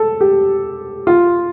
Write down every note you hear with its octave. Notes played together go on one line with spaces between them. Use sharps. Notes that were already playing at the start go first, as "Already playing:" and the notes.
Already playing: A4
G4
F4